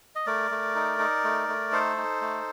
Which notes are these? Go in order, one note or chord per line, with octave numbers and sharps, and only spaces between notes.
D#5
A3 A#4 D5
A3
D#4
D#4
A3
A3
D#4 A4 C5
D#4
A3